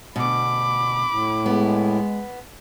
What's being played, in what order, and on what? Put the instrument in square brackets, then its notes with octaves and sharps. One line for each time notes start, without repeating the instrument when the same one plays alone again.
[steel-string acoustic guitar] D2 B2 [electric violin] B5 D6
[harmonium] A2
[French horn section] G#3 [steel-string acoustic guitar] B3